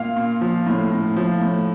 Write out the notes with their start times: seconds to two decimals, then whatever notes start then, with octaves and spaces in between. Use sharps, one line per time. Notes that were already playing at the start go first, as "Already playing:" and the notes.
Already playing: A#2 F5
0.17 A#2
0.41 F3
0.67 A2
0.92 A2
1.16 F3
1.41 A2